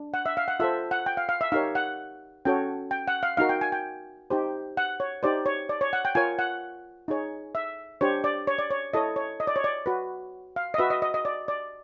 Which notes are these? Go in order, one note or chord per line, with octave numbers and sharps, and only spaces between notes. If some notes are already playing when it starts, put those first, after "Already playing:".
Already playing: D4
F#5
E5
F5
F#5
F4 A4 C5 E5
F#5
G5
F5
F5
E5
D#4 G4 A#4 C#5 F5
F#5
C#4 F#4 A4 C#5 G5
G5
F#5
F5
D#4 F#4 A#4 F5
G5
G#5
G5
D#4 G4 C5
F#5
C#5
D#4 G4 C5 D5
C#5
D5
C#5
F#5
G5
F4 A#4 C#5 G#5
F#5
D#4 G#4 C#5
E5
D4 G4 C5 C#5
D5
C#5
D5
C#5
E4 A4 C#5 D#5
C#5
D#5
D5
C#5
D5
F#4 B4
F5
D#5
F#4 B4 E5
D#5
D#5
D#5
D5
D5